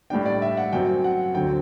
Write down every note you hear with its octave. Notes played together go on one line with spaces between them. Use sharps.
A2 G3 D4 G5
D5
E5
F#5
F#2 F#3 C4 G5
F#5
D2 D3 F#3 C4 G5